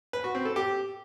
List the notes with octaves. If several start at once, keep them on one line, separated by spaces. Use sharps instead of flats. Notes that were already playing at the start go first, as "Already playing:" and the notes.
B4
F#4
C4
A4
G4